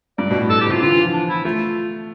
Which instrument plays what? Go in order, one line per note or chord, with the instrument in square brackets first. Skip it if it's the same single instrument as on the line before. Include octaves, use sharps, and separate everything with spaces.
[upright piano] G2 [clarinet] D5
[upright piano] B2
A2
[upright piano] B2 [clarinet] A4
[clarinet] G4
[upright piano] C3 [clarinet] F4
[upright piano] D3 [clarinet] F4
[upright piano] E3
F3
[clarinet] D4
E4
[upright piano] A3 [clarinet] F4